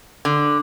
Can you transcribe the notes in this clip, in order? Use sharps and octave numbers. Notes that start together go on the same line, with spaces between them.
D3